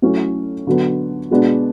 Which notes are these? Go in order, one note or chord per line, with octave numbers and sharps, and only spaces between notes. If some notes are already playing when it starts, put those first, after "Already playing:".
F#3 A3 C#4 E4
D3 F#3 B3
B2 G#3 B3 D4